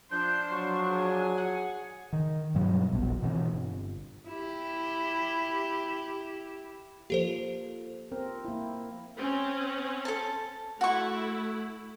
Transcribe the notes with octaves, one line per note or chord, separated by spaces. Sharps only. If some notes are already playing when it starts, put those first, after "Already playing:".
F3 D4 C5 G6
F#3 C#6
G#4 G#5
F#5
D#3
G2 B2 F#3 G3
E1 A#1 B2
B2 E3 C4
G1
E4 G4
F3 A#3 G4 A4 C5
C4 A#4
A#3 E4
C4 C#4
A4 A5
A3 E4 F#4 C#6